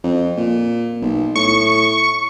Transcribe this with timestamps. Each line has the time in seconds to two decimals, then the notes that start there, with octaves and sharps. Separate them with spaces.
0.04 F2
0.37 A#2
1.02 B1
1.36 A2 C#6